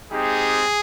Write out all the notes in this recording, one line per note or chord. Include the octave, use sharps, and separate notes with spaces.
G#3 C4 D#4 G4 G#4